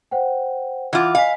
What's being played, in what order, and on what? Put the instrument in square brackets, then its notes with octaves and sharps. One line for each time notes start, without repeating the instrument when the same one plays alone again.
[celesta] C5 F#5 G5
[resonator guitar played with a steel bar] E3 F4 [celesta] F#5 D6
[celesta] D#5 G#5 B6 [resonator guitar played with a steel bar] F5